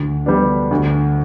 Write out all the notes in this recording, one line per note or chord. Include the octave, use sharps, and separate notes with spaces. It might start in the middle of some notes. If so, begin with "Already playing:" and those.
Already playing: D2
D3 G3 B3 D4
D2